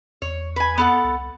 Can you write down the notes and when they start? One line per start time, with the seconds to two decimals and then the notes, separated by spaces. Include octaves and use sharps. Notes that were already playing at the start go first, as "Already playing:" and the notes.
0.22 E2 C#5
0.56 B4 G#5
0.78 B3 A4 F#5
1.04 C2